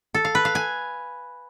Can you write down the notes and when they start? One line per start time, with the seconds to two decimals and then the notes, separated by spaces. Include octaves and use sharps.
0.14 A4
0.25 F5
0.35 B4
0.45 F5
0.55 G#5